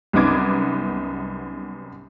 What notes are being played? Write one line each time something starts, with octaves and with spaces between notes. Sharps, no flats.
C2 F#2 B3 D#4 D6 G#6